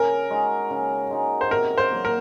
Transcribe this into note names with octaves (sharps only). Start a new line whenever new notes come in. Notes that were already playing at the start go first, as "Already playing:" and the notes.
Already playing: C#3 A#4
G#3 D#4 F#4
C#3
G#3 D#4 F#4
C5
C3 A#4
C5
F#3 A#3
A#4